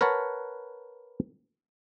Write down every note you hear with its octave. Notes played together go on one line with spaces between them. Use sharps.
A#4 B4 C#5 F#5 A5